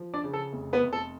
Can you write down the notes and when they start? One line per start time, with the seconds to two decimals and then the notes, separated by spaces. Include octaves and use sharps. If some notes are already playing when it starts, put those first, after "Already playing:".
Already playing: F3
0.14 D4 D5
0.24 C#3
0.33 A4
0.53 F1
0.73 B3 B4
0.83 F1
0.93 A4